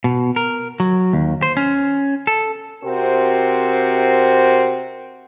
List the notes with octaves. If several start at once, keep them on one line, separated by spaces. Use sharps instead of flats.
B2
A#4
F#3
D#2
C5
C#4
A4
C3 C4 F#4 A#4 C5